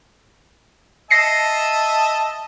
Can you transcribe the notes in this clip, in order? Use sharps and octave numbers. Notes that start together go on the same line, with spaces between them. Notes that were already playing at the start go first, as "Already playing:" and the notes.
D#5 E5 A5 A#6 C7 C#7